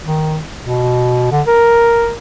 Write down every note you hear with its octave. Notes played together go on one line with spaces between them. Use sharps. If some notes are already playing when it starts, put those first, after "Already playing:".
D#3
B2
D3
A#4